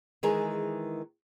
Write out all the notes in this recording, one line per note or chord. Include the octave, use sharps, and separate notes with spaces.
D#3 E3 G#3 G#4 A#4